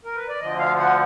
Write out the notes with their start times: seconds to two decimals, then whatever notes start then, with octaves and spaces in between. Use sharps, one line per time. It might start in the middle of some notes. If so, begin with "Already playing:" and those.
0.04 A#4
0.16 B4
0.29 D5
0.40 D2 D3 F3 D#5
0.59 F5
0.78 F#5